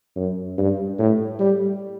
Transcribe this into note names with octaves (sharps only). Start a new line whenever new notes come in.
F#2
G2
A2
G3